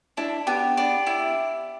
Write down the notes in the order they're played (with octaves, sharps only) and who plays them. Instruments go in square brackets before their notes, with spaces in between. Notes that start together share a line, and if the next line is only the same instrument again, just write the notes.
[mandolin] D4 [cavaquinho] E4
[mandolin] B3 [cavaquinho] G4
[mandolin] D4
E4